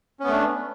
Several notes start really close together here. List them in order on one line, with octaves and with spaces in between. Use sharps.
C#4 B3 A3 D4